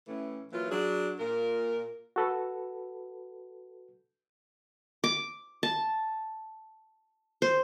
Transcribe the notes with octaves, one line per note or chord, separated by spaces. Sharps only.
A2 E3 A3 C#4
E3 F#3 A#3 F4
F#3 D4 G#4
A#2 A#4
F#4 A4 B4
D6
A5
C5